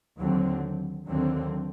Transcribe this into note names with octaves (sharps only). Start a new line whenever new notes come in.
D#2 D3 F#3 C4
D#2 D3 F#3 C4